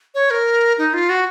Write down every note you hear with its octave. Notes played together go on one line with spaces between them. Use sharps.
C#5
A#4
D#4
F4
F#4